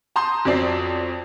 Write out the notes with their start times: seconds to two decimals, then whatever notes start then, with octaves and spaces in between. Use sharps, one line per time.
0.16 A5 A#5 C6 D#6 G6
0.45 F2 F#3 C4 D5 A5 C7